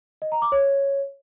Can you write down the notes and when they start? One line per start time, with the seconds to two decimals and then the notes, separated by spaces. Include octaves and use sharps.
0.22 D#5
0.32 A#5
0.42 D6
0.52 C#5